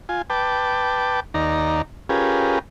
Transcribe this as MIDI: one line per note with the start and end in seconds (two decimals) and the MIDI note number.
0.09 0.22 65
0.09 0.22 80
0.30 1.20 71
0.30 1.20 79
0.30 1.20 81
0.30 1.20 86
1.34 1.82 39
1.34 1.82 63
1.34 1.82 74
1.34 1.82 82
2.09 2.59 61
2.09 2.59 65
2.09 2.59 67
2.09 2.59 68
2.09 2.59 70
2.09 2.59 71